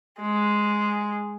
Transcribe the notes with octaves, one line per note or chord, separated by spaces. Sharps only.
G#3